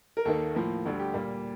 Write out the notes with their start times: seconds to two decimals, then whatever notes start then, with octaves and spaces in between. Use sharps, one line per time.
0.17 A#4
0.25 D#2 D#3 A#3 A4
0.55 A2 F3 A#3
0.85 D2 D3 G3
0.99 G4
1.14 A#2 G3 A#3